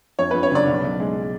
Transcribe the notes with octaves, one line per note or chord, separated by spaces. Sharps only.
F2 C#5
F2 B4
C#5
F#1 D5
B1
B1
G#3